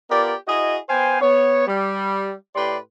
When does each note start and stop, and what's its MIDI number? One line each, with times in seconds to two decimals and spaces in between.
0.10 0.34 59
0.10 0.34 65
0.10 0.34 67
0.10 0.34 70
0.10 0.34 74
0.47 0.77 64
0.47 0.77 66
0.47 0.77 68
0.47 0.77 75
0.88 1.20 59
0.88 1.20 72
0.88 1.20 77
0.88 1.20 79
0.88 1.20 80
1.21 1.64 59
1.21 1.64 73
1.67 2.34 55
2.55 2.77 45
2.55 2.77 67
2.55 2.77 71
2.55 2.77 74
2.55 2.77 84